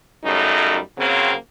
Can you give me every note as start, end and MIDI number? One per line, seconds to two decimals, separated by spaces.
0.24 0.78 42
0.24 0.78 49
0.24 0.78 55
0.24 0.78 57
0.24 0.78 63
0.98 1.32 49
0.98 1.32 54
0.98 1.32 58
0.98 1.32 60